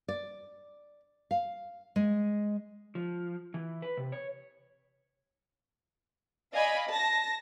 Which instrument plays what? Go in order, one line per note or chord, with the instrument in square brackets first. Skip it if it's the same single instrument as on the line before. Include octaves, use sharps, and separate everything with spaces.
[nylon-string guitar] D5
F5
G#3
[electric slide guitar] F3
E3
B4
C3
C#5
[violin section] D5 D#5 F5 G#5 B5
A5 A#6